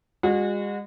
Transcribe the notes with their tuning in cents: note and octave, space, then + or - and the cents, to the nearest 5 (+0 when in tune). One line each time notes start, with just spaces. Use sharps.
G#3 -40 F#4 -30